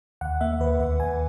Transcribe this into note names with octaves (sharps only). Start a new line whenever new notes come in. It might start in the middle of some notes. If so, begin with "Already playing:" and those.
D#2 F#5
A#3 E5
D#2 B4
D#2 E5
D#2 G#5